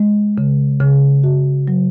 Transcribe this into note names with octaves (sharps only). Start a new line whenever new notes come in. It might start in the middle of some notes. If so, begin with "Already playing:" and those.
Already playing: G#3
C#3
C#3
F#4
F#3